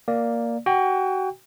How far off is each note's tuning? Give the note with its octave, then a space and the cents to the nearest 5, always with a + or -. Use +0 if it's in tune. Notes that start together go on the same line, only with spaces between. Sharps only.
A#3 +0 D5 +0
F#4 +30 G5 +30